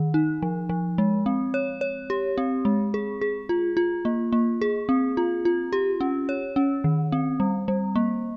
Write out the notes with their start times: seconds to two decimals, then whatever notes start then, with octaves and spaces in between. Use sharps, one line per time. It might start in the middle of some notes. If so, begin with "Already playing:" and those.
Already playing: D#3
0.14 D#4
0.42 F3
0.69 F3
0.98 G#3
1.26 C4
1.54 C#5
1.81 C#5
2.10 G4
2.38 C4
2.65 G#3
2.94 G#4
3.21 G#4
3.49 F4
3.77 F4
4.05 A#3
4.32 A#3
4.61 G#4
4.89 C4
5.17 F4
5.45 F4
5.73 G4
6.01 C#4
6.29 C#5
6.56 C#4
6.84 D#3
7.12 C4
7.40 G3
7.68 G3
7.96 A#3